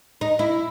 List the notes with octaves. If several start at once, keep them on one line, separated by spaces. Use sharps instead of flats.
D#4
E4